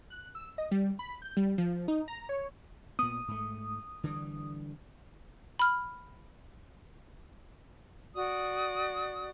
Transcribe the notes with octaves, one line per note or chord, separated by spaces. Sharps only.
F#6
E6
D#5
G3
B5
G6
G3
F3
D#4
A#5
C#5
A#2 B3 D#6
G#2 A3
D3 E3 G3
B5 F6
F#4 D5 D#6